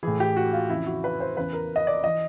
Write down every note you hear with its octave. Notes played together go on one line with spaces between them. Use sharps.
A2 E3 G#4
G4
F#4
F4
F2 C#3 E3 E4
F#4
B4
C5
E2 C#3 E3 B4
A#4
D#5
D5
E3 D#5